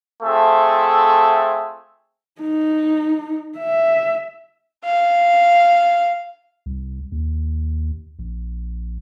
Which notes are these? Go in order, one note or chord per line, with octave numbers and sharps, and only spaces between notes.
A3 C4 F4 G#4 A4 E5
D#4
E5
F5
C2
D#2
A#1